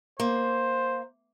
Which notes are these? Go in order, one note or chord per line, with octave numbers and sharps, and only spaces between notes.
A#3 C5